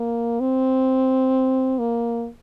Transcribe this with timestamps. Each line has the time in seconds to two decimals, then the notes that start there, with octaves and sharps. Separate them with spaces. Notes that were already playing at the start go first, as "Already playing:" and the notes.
Already playing: A#3
0.40 C4
1.79 A#3